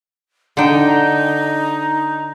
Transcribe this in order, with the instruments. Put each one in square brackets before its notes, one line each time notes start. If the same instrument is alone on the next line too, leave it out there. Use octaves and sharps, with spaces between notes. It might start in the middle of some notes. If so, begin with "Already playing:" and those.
[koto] D3 G5 [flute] D#4